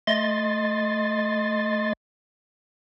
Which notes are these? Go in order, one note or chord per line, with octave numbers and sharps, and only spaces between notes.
A3 D#5 C6 A6